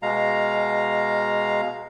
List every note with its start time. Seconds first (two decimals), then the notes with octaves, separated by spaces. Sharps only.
0.02 B2 G#3 F5 A#5